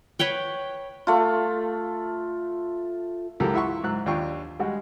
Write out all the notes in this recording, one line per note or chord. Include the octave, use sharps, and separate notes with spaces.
B4 C#5 F#5 G5
A3 F4
C#2 E3 F#3 G4 A4 A#4
E4 F4 E5 F#5 C6 C#6
G#2 F#3 E6 F#6
D#2 D4 F4 G5 C#6
G3 G#3 F#4